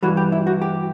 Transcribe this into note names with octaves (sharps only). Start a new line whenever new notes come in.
G2 E3 G3 F#4
G4
E4
F#4
G4